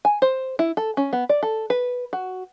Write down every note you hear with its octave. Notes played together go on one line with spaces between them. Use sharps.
G#5
C5
E4
A4
C#4
B3
D5
A4
B4
F#4